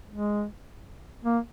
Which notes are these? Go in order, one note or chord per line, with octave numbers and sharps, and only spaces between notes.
G#3
A#3